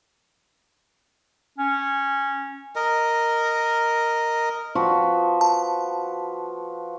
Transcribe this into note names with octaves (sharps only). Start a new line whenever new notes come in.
C#4
A#4 D#5
F3 F#4 B4
A5